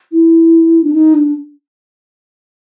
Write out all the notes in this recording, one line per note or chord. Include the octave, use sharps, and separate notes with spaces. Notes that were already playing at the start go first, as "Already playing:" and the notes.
E4
D4
D#4
D4